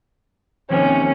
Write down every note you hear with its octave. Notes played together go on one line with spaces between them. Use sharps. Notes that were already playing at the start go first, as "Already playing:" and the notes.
D#2 C3 D#3 F3 C#4